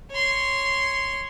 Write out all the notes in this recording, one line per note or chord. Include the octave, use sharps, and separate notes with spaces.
C#5 C6